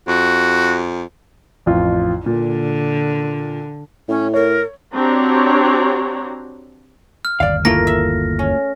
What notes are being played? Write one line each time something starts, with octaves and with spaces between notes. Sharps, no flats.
F2 F#4
A1 F2 F4
A#2 D3
A2 C#4
A#4 C#5
C4 D4 F#4 G4 C#5 A#5
F6
G1 D#2 D5 F5
A3 A#3 E4 F4 A#4 A#6
E5
C#4